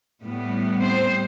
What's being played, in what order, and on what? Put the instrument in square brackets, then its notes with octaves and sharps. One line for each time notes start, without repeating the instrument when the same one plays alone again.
[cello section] A2 G3 B3
C4 C5